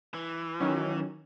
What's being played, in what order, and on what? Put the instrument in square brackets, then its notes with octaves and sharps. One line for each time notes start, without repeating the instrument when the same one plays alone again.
[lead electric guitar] E3
[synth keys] D#3 F#3 C#4